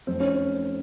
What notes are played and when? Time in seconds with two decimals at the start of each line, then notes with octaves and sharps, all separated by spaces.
0.07 F1 C4
0.20 C#4